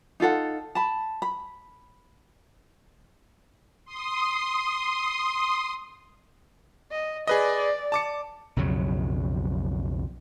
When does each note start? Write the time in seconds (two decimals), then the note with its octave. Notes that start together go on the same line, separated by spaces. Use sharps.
0.20 D#4 F4 A4 F#5
0.75 A5 B5
1.22 B5
3.85 C6 D#6
6.92 D#5
7.27 G#4 B4 D5 D#5
7.92 A5 D6 C#7
8.56 B1 F2 C#3 F#3